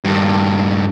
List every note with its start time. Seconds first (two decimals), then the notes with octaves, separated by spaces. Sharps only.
0.05 G2 D#3